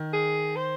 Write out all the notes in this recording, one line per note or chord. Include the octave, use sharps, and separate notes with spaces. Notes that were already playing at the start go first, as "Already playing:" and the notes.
Already playing: D#3
G#4
C5